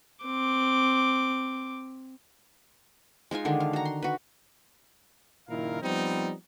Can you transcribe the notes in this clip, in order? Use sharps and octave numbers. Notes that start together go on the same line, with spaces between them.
C4 D6
G#3 D#4 F4 G#5
D3 D#3 G#3 D4
F5
F#4 A#5
C6
F#4 B4
F#1 A#2 D#3 E4 A#4 F5
F3 G3 B3 C4 D#4